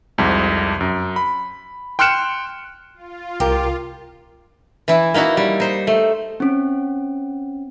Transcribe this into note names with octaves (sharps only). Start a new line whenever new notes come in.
C2 F2 G#2
F#2
B5
G5 C6 F6 F#6 C#7 E7
F4
C2 G4 A#4
E3 E4
A#3 D#4 E4 F#4
G3
D#4 C5
A3
C4 C#4